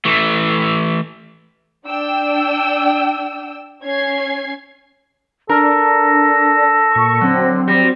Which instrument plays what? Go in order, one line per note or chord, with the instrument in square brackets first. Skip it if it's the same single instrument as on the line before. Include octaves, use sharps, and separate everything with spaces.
[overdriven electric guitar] E3 A3
[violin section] D4 G5 E6
C#4 G#6 C7
[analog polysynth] D4 [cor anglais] A4 [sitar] A#4 [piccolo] A#6
[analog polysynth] A#2 C#6
[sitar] D3 [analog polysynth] F#3 C4
[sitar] G3 [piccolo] A#6